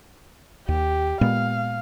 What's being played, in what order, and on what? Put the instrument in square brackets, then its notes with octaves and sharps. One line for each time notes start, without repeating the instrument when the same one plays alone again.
[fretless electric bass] D#2 [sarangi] G4
[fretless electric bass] A#2 G#3 B3 [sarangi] F5